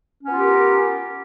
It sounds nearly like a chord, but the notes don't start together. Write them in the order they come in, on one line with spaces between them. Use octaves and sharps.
C#4 B3 F4 G4 A#4